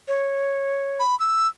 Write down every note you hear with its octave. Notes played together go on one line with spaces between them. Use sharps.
C#5
B5
E6